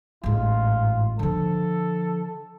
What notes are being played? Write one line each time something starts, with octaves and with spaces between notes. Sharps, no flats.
A1 G#2 F4
D3 F3 A4